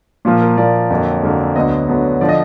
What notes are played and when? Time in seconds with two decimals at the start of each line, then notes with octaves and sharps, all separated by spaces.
0.25 A#2 F3 A#3 F4
0.42 A#4
0.58 A#2 F3 A#3 D5
0.91 F2 D3 F#3 A#3
1.23 F2 D3 F#3 A#3
1.55 D2 D3 F#3 B3 D#5
1.88 D2 D3 F#3 B3
2.21 D3 F3 D5
2.29 D#5